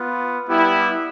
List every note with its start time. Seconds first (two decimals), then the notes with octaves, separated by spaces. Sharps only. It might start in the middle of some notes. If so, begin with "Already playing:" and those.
Already playing: B3 F4
0.46 G3 B3 E4 G4